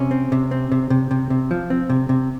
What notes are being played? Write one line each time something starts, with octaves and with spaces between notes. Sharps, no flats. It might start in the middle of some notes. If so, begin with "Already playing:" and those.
Already playing: C3 C#4
C4
C3
C4
C3
C3
C3
C3
F3
C4
C3
C3